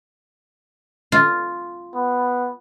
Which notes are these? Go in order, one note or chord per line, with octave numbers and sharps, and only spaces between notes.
F4
B3